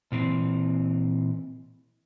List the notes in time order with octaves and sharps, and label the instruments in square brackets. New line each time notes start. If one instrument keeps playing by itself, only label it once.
[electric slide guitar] A#2 E3 C4